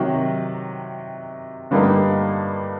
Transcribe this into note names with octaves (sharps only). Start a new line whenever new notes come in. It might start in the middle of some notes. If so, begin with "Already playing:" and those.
Already playing: C3 D#3 F#3
G2 D3 G3 A#3 D#4